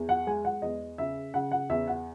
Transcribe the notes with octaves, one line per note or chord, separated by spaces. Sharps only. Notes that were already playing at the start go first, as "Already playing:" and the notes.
Already playing: E2
F#5
G#3 G#5
F#5
E2 D#5
C#3 E5
C#3 F#5
F#5
E2 E5
F#5